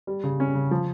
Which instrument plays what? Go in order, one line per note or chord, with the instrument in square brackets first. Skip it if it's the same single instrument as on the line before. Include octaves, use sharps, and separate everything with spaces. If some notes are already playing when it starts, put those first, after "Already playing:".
[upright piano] G3
C#3
C#4
C#3
F3